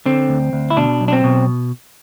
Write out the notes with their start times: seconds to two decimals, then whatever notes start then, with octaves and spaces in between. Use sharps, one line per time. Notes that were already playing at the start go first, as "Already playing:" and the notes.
0.06 D3 C4
0.29 D2
0.53 D2
0.70 E4
0.77 B2 D4
1.01 B1
1.08 D4
1.13 C4
1.24 B2